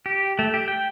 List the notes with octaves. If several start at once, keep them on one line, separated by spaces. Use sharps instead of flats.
G4
A3
G4
G5